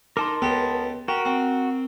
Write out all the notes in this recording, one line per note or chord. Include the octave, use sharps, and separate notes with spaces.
D#4 A#4 A5 C6 D6
C#2 B3 G4 A4
F#4 G4 A#4
C4